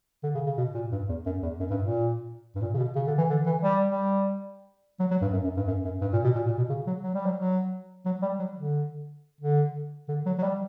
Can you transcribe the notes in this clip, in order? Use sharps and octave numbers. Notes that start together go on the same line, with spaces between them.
D3
C#3
C#3
B2
A#2
G2
E2
F#2
E2
F#2
G2
A#2
G2
A#2
C#3
B2
C#3
D3
E3
D3
E3
G3
G3
F#3
F#3
G2
F#2
F#2
G2
F#2
F#2
G2
A#2
B2
A#2
A#2
B2
C#3
F#3
F#3
G3
F#3
F#3
F#3
G3
F#3
D3
D3
D3
F#3
F#3
G3